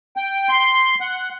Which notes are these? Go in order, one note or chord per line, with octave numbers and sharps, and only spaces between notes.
G5
C6
F#5